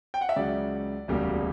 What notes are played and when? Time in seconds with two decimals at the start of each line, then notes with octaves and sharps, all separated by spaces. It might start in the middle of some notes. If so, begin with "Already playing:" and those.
0.14 G5
0.21 F#5
0.29 E5
0.36 C#2 C#3 F#3 D5
1.08 E1 D2 C#3 G3 A#3